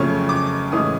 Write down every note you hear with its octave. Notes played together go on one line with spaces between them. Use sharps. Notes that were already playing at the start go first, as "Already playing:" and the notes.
Already playing: F2 C#3 F#3 A3 C#4 C#6
D6
A1 A2 E3 G#3 C#4 D#6